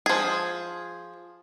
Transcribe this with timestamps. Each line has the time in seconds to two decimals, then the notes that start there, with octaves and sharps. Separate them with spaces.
0.06 F3 G#4